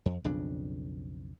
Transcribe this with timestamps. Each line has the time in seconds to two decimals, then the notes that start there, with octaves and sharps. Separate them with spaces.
0.06 F2
0.24 B1 F2 C#3 D4